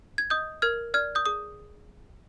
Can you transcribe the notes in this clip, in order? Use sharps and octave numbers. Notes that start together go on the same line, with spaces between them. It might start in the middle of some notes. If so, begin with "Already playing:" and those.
G#6
D#5 D#6 G6
A#4 F6 G#6
D5 F6 G#6
D#6 G6
G#4 D#6